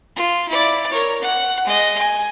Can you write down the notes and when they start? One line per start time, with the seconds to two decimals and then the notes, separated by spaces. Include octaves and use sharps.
0.16 F4
0.49 E4 D5
0.92 A#4 C#5
1.21 F#5
1.65 G#3 D#5
1.98 G#5